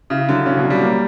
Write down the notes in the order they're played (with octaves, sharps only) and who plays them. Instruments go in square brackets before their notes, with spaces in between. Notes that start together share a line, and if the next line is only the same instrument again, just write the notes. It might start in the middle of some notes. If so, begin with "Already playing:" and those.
[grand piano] C#3 [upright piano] E4
[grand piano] D3 [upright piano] F#3
[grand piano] C#3 [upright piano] C#4
[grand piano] B2 [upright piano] F#3
[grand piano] G3
[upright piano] A#3